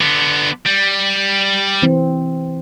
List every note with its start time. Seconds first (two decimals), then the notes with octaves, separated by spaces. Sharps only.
0.01 D3 B3
0.66 G3
1.82 E3 C4